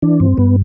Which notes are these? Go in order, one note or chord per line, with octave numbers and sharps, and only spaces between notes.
E3 D4
G2 C4
G2 B3